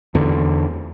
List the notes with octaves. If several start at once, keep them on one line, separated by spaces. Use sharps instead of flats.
E2 D3